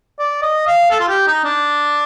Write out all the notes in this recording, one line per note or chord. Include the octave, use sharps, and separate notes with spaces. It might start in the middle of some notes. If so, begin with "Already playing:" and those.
D5
D#5
F5
A4
F4
G4
D#4
D4